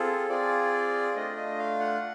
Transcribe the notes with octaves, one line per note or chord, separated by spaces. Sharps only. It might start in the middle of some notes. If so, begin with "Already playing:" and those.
Already playing: C4 F4 G#4 A4
C4 F4 G#4 D5
A3 D4 F4 D#5
D#5
F5
F#5